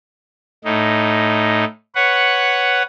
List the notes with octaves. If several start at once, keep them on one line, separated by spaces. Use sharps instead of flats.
A2 D#4
B4 C#5 F#5